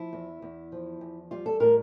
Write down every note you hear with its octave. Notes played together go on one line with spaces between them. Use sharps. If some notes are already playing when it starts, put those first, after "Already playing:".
Already playing: F3 E4
E2
E2
F3
E2
G3 F4
A4
A2 A#4